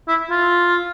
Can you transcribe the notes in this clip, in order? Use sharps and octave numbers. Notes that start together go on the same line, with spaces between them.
E4
F4